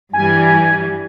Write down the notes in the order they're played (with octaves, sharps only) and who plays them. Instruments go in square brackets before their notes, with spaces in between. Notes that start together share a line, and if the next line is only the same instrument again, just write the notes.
[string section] G2 E3 G3 [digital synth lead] G#5